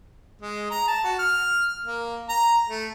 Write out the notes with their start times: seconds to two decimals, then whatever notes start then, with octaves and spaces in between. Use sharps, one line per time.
0.41 G#3
0.70 A#5
0.88 A5
1.04 F#4
1.19 F6
1.84 A#3
2.29 A#5
2.69 A3